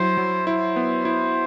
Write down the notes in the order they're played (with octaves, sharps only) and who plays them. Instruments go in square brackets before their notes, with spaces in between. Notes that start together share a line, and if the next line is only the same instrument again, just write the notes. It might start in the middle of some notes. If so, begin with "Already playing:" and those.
Already playing: [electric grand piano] F#3 E4 [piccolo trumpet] C5
[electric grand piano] F#3
[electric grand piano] E4 [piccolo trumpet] C5
[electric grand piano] B3
E4